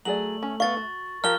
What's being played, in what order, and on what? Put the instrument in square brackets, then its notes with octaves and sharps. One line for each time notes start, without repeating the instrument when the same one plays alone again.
[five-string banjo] F#3 G#4 D5 [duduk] A3 [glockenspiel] F#7
[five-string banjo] C#4
[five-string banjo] B3 E5 F5 [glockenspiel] C#6 A6
[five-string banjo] F#4
[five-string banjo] F3 G4 F5 [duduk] A#4 [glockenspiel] F6 G7